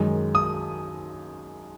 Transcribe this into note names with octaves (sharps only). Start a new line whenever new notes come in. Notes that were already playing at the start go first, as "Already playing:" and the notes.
Already playing: F#2 D#3 G#3
D#6